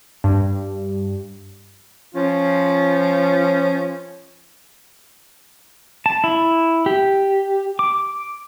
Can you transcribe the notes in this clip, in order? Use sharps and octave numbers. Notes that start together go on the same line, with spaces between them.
G2
F3 C#4 F4
A5
E4
G4
D6